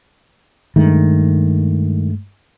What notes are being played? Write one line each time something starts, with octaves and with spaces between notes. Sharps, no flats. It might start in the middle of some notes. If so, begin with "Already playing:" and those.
G2 D#3 G#3 A3